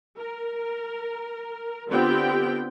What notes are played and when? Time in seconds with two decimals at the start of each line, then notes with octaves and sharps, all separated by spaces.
0.19 A#4
1.90 D3 B3 C4 F4 G4 G5